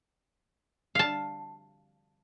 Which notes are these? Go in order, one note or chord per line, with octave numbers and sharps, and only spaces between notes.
F5 A5